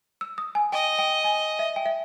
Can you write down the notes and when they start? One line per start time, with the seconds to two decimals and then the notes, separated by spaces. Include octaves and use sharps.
0.21 E6
0.38 D#6
0.55 G#5
0.72 D#5 G5
0.99 G5
1.24 G#5
1.59 E5
1.76 G5
1.86 E5